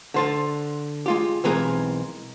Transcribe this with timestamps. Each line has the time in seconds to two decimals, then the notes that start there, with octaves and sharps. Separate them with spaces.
0.14 D3 C5 A5
1.06 G#3 F4 G4
1.44 B1 E3 G#3 C4 G#4 A#4